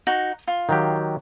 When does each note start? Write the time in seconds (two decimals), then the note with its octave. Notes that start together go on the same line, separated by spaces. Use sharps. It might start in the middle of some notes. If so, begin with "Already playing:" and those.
0.07 D#4 F#4
0.47 F4
0.69 D#3 F#3 G4